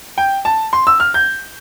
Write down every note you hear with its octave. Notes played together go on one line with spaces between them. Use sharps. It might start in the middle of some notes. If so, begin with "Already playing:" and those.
G5
A5
C6
E6
F6
G6